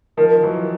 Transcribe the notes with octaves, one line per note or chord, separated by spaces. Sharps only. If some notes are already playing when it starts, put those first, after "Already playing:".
D#3 F3 A#4
E3 F#3